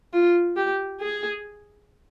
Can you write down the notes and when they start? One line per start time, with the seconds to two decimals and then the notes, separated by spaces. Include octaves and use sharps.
0.13 F4
0.57 G4
1.00 G#4